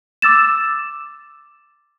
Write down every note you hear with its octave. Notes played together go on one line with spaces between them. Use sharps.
D6 E6 A6 E7